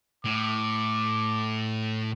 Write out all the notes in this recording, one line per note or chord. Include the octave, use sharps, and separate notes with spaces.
A2 D6